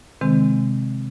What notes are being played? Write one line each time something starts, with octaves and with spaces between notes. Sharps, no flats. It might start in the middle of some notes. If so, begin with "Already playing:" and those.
C3 D#3 G#3 C4